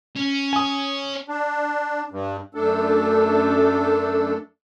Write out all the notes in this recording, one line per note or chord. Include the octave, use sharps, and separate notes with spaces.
C#4
G#5 D#6
D4
G2
F#2 A3 D4 A4